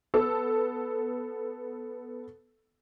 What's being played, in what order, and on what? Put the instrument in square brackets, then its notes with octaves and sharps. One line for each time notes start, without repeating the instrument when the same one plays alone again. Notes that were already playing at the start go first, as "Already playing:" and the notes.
[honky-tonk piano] B3 A4 E6